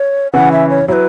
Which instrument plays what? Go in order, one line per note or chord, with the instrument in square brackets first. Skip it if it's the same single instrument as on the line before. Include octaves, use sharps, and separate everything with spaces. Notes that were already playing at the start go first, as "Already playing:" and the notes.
Already playing: [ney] C#5
[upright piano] C#3 E3 C#4 E4 [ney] F#5
[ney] E5
C#5
[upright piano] F#3 E4 [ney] B4 C#5